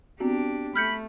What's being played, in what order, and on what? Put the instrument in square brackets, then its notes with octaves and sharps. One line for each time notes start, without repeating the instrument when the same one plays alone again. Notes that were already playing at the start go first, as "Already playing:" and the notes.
[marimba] B3 C4 F#4 [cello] D4 G4
[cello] A3 [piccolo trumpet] B5 [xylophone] F6 G6 C#7